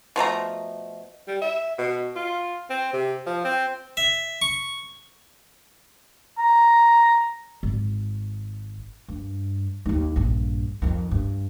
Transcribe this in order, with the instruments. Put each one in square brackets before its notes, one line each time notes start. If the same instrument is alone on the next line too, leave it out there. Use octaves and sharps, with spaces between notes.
[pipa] B2 F3 A3 A#5
[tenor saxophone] G3
E5
B2
F4
C4
C3
F3
C4
[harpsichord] E5
C#6
[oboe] A#5
[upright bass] G#1
G2
D#2 D#4
A#1 G2
F2 D#3
G2